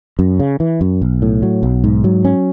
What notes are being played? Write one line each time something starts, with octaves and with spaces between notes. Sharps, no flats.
F#2
C#3
E3
F#2
B1
A2
F#3
B1
G#2
F#3
C#4